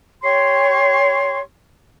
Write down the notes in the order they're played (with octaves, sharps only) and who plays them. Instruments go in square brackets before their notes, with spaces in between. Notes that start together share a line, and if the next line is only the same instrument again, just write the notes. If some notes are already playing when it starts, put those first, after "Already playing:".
[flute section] G4 C#5 C6 C#6